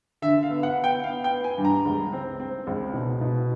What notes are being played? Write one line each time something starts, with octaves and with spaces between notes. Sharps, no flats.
D3 E5
F5
B3
F#5
B3
G5
B3 F5
G5
B3
G#5
G2
A#5
C#2
C4
C4
C#2
B2
B2